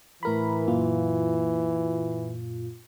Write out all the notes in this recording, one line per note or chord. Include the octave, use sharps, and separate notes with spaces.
A2 E3 A#4 B5
F#2 A#2 F4